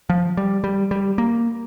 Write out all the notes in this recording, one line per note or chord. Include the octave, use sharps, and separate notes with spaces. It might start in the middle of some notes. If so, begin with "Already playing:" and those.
F3
G3
G3
G3
A#3